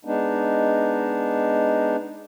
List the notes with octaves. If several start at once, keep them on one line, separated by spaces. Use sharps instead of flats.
G#3 B3 D4 D#4